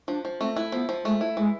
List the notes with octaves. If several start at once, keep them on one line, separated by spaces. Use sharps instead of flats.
F3 D4
F3
A3 C4
E4
F3 B3
F3
G#3 A3
E4
E3 G#3